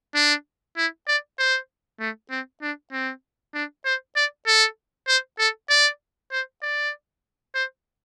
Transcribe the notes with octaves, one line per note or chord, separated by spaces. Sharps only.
D4
E4
D5
C5
A3
C4
D4
C4
D4
C5
D5
A4
C5
A4
D5
C5
D5
C5